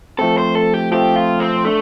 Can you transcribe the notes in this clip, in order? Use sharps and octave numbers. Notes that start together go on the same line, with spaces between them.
F3 A3 C4 A4
C5
A4
G4
F3 A3 C4 G4
F4
C4
A3 D4 A4